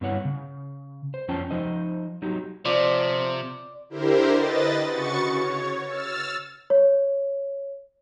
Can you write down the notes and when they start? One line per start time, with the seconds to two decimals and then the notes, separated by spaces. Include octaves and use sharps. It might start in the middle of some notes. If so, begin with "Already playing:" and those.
0.01 G2 B3 E4 C#5 F#5
0.25 C#3
1.14 C5
1.28 F2 F3 C#4 C#5 G5 A5
1.51 F3 D#4 C5 D#5
2.22 F#3 D#4 G4
2.65 C3 F3 D5
3.89 D3 E4 G4 A#4 C5
4.33 B4 D#5 A6
4.90 C#3 F#4 C#6 A6 C#7
5.35 C#5
5.88 E6 F6 A6
6.70 C#5